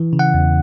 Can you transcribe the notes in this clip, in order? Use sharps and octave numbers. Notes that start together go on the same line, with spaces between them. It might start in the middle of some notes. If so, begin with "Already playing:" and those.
Already playing: E3
C#3
F#5
E2